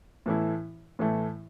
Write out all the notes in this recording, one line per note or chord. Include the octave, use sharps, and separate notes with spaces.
A2 E3 A3 E4
A2 E3 A3 E4